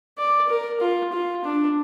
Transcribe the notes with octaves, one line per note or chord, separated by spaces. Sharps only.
D5
A#4
F4
F4
D4